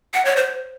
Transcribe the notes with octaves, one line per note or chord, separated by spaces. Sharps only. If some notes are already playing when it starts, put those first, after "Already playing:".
F#5
C#5
C5